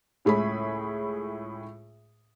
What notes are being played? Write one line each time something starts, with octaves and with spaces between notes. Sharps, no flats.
C#2 A2 G#4 E5 B5